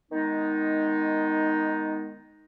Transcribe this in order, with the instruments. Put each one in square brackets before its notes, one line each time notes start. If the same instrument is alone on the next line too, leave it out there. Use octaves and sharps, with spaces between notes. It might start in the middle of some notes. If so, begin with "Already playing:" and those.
[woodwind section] D#3 G#3 B3 D#4